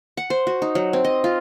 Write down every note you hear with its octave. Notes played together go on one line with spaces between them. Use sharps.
F#5
C5
F#4
D#4
F#3
C4
D#5
F4